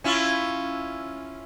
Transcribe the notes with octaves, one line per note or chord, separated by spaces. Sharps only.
C#4 E4 F4